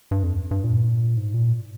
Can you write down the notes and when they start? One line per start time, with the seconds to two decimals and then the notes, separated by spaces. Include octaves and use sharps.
0.11 G2
0.23 F2
0.51 G2
0.64 A#2
1.17 G#2
1.34 A#2